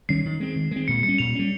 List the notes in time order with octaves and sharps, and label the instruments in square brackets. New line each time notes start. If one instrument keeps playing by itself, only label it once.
[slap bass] D#3 G3 C#4 [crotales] C7
[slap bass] D#3
G#3 C4
D#3
G#3 C4
[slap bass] A#2 [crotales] C#7
[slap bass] G3 [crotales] C#7
[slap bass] C#4
[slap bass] A#2 [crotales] F7
[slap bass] G3 C#4